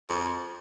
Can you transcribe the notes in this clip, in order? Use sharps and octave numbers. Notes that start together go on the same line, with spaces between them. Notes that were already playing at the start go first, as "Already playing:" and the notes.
F2